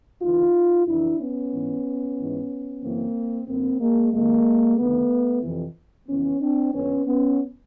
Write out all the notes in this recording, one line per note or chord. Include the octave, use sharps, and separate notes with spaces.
D2 C#3 E3 D#4 F4
F2 C#3 E3 D4 E4
B3 C#4
G#2 E3
G#2 E3
F#2 C#3 E3 A#3 C4
F#2 D3 A#3 C4
G#3 A#3
F2 C3 D#3 G#3 A#3
D2 C3 D#3 A3 B3
F2 C3 E3
F2 C#3 E3 B3 C#4
C4 D4
F2 D3 B3 C#4
B3 C#4